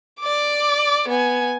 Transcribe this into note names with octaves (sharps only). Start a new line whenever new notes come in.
D5 D6
B3 G#5